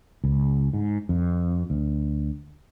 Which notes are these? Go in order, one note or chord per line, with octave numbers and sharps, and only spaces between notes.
C#2
G#2
F2
D2